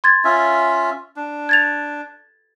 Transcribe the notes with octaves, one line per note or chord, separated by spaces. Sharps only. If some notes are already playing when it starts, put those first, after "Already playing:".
C6 G#6 A6
C#4 F4 E5
D4
G#6 A6 F7